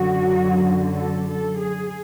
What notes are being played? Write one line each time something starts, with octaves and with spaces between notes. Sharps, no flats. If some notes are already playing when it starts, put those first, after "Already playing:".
Already playing: F#2 D3 F#3 F#4
A4
A4
G#4